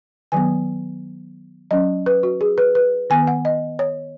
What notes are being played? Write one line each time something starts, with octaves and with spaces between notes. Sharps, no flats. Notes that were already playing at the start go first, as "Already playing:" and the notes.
D#3 F#3 B3 G#5
F#3 C#4 D#5
B4
F#4
G#4
B4
B4
D#3 B3 G#5
F#5
D#5
C#5